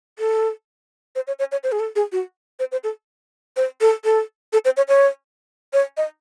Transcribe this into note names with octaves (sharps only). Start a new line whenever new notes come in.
A4
C5
C#5
C#5
C#5
C5
G#4
A4
G#4
F#4
C5
C5
A4
C5
A4
A4
A4
C5
C#5
C#5
C#5
D#5